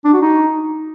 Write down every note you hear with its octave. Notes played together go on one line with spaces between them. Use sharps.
D4
F#4
D#4